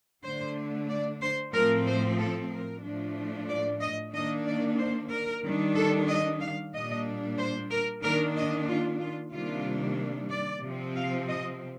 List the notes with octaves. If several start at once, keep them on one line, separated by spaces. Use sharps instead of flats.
D3 A3 D4 C5
D5
C5
A2 F3 C4 A#4
C5
A4
A#4
A2 F3 A3 D4
D5
D#5
D#3 A#3 D4 D#5
D5
C5
A#4
D#3 G3 D4
A4
D#5
F5
A#2 G3 A#3 D4 D#5
C5
A#4
D#3 A#3 D4 A#4
D#5
F4
F4
C3 D#3 G3 A#3 D4 F4
D5
C3 F3 C4
F5
D#5